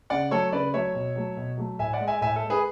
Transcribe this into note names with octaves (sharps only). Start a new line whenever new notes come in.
C#3 D5 F#5
F#3 A3 A4 C#5
C#3 B4 D5
F#3 A3 C#5 E5
B2
F#3 A3
B2
F#3 A3
A2 E5 G#5
D5 F#5
G#3
E5 G#5
A2 E5 G#5
A4
G#3
G#4 B4